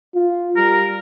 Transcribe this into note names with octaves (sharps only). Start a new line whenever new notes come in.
F4
G3 A#4